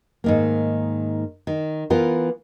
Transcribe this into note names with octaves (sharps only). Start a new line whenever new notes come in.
G#2 D#3 A#3
D#3
E3 B3 F4 A#4